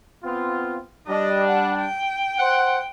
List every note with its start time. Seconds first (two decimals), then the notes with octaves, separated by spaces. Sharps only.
0.24 B3 C4 F4
1.07 G3 D4 D#5
1.48 F#5
1.78 G5
2.38 C5 F#5